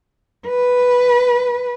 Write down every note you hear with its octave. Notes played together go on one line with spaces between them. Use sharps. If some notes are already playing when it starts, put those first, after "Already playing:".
B4